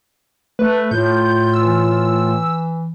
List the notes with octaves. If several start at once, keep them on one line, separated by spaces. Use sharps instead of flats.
A3 B4
A2 F4 G6
E3 E6